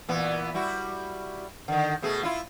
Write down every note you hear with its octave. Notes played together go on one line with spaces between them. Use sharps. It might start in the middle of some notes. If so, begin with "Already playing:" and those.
A#2 E3 B3
G3 E4 F#4
D3 D#3
B2 A3 G#4
E4 F4